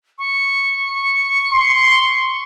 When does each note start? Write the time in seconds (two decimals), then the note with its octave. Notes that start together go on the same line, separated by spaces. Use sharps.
0.18 C#6
1.53 C6